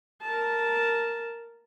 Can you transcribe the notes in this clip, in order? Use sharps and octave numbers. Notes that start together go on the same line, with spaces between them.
A#4 A5